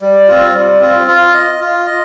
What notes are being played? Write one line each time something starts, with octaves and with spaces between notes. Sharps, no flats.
G3
C4 F4
G3
C4 F4
F4
D#5
F4
D#5